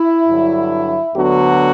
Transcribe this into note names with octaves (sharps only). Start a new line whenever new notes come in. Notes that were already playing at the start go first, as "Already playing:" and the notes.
Already playing: E4
G2 D3 F#3
D2 D3 F#3 B3 F#4